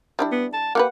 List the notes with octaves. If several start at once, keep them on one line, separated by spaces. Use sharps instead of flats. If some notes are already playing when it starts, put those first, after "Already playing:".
G3 D4 E4
B3
A5
A#3 G4 B4 F#5